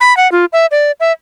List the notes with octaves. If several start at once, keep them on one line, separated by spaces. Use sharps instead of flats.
B5
F#5
F4
E5
D5
E5